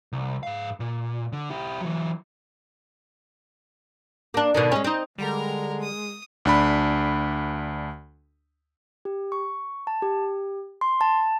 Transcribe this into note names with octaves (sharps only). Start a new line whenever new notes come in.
C2
G#2 F5
A#2
D3
E4 G4
E3 F#3
A#3 D4
B2 D3 D#3
G#3 C#4
C4 D#4
D3 G3 G#3 A#4 A#5
D#6
D2 D4 B5
G4
C#6
A5
G4
C6
A5